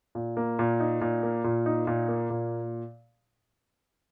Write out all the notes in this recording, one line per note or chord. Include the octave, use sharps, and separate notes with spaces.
A#2
A#3
A#2
D#4
A#2
A#3
A#2
D#4
A#2
A#3
A#2